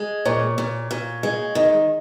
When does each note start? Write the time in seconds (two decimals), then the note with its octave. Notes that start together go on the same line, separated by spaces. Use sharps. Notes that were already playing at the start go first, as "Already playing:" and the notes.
Already playing: G#3
0.25 A#2 C#5
0.58 A#2
0.91 A#2
1.23 G#3
1.55 D#3 D#5